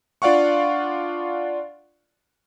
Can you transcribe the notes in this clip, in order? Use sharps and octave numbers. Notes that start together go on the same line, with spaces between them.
D4 F4 D5 F5 F#5 C#6